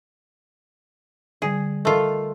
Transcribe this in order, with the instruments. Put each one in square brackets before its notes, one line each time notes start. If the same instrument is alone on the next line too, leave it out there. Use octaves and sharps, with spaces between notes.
[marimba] D3 G3 [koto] G#4
[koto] A3 F4 [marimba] A4 A#4 D#5